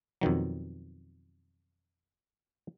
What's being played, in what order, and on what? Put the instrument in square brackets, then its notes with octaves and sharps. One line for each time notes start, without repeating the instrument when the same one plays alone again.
[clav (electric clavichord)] F2 B2 D#3 F#3